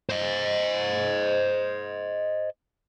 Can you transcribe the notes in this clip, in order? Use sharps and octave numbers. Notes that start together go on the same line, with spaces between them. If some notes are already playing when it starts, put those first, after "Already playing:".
C5 D#5